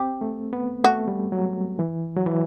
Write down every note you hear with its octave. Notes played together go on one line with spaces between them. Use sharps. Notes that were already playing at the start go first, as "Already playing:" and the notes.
Already playing: C4 G4
A3
B3
A3 F#4
G3
F#3
E3
F#3
E3